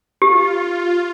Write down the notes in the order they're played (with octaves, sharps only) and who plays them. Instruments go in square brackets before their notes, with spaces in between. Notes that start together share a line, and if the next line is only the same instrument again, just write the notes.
[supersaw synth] F4 [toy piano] G4